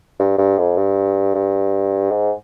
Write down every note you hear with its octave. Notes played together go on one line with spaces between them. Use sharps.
G2
G2
F2
G2
G2
G#2